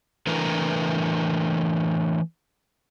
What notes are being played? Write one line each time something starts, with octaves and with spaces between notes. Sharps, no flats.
E3 A3 D4 A#4 B4 A#5